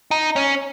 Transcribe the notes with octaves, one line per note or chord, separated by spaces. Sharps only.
D#4
C#4